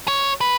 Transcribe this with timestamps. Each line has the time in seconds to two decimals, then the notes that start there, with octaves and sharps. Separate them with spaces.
0.08 C#5
0.41 B4